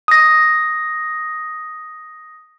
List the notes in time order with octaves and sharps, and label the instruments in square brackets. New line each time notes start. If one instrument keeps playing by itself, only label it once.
[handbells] D#6 A#6